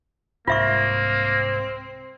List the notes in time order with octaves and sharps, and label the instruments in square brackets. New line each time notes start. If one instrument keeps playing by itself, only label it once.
[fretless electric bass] C2 G#2 G#3 [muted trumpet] A#3 [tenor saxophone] C4 [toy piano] F4 E5 C#6